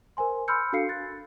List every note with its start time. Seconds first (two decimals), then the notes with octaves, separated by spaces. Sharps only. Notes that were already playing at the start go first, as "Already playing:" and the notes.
0.17 A#4 C5 G#5 C6
0.48 B5 C6 E6 F6 G6 C#7
0.73 D4 F#4 A4 F5 C7 C#7
0.89 F#6 A6